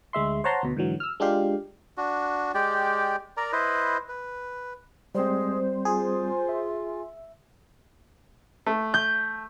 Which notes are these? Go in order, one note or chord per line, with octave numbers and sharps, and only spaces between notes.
D2 G#3 E5 C6
C5 C#5 F#5 A5 A#5 C6
D2 B2
G#2 D3 E3 F#3
E6 F6
G#3 D4 F4 G4 F5
D4 F#4
G#3 G4 D5 G5
A#4 D5 A#5
E4 B4 C5 D#5
B4
G3 G#3 C4 C5
F4 G#4
E5
A3
G6